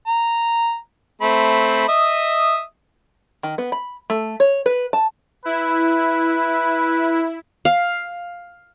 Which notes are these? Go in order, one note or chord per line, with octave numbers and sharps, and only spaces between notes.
A#5
A3 C4 B5
D#5 E5 D#6
D#3
B3
B5
A3
C#5
B4
A5
E4 B4
F5